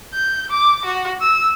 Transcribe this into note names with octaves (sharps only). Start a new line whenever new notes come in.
G6
D6
F#4
E6